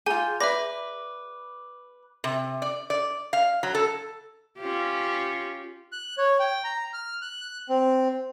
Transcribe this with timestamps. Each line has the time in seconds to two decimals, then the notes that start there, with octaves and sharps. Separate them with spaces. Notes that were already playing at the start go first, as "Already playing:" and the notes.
0.06 F4 G#4 G5 G#5 A#5
0.40 B4 D5 E5 B5 D6 A#6
2.24 C3
2.62 D5
2.90 D5
3.33 F5
3.63 F#3
3.75 A4
4.59 C#4 F4 G4
5.92 F#6
6.18 C#5
6.40 G5
6.64 A#5
6.93 F6
7.22 F#6
7.69 C4